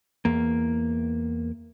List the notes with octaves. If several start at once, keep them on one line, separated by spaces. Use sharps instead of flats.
E2 A#3